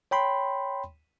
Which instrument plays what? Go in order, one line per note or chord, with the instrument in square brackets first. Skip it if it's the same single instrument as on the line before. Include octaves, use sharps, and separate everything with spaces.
[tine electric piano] C#5 G5 B5 C6